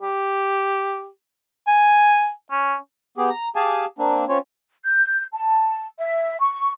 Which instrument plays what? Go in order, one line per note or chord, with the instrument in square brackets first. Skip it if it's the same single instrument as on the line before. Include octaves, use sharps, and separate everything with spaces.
[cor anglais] G4
G#5
C#4
[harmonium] B3 G4 G#4
A#5
G4 G#4 F5 G#5 A5
A#3 C4 D4
C4 C#4 F4 C#5
[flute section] G6
A5
E5
C#6